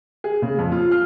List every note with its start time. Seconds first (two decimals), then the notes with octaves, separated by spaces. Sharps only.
0.24 G#4
0.42 C#3
0.59 F2
0.72 F4
0.92 F6